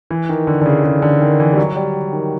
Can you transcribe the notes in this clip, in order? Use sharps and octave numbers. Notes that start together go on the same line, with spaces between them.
E3
D#3
D3
D3
C#3
C#3
D3
D#3
E3
G3
F#3
G3
D#3